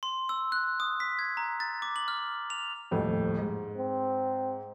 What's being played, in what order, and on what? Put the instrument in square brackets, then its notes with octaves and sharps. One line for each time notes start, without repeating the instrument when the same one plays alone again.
[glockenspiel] C6
E6
F#6
D#6
B6
G#6
A#5
A6
D6
F#7
F6
F7
[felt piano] D#1 F2 A2
G#2
[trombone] C4